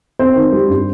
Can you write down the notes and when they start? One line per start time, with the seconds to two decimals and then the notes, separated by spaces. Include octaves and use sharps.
0.19 C4 C5
0.36 D#3
0.52 G3
0.68 G2